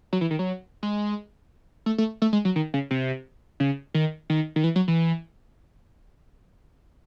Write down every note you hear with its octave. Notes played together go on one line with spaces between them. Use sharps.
F#3
E3
D#3
F#3
G#3
A3
A3
A3
G#3
F#3
D#3
C#3
C3
C#3
D#3
D#3
D#3
E3
F#3
E3